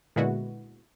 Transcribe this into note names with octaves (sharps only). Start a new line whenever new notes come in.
A#2 D3 G#3 B3 E4 F#4